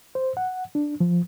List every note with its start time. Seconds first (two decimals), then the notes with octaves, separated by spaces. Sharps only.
0.15 C5
0.37 F#5
0.75 D4
1.00 F3